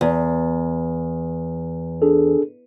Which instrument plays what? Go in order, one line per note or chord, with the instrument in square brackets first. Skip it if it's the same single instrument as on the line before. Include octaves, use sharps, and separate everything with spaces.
[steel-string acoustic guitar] E2
[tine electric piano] D4 G#4 A4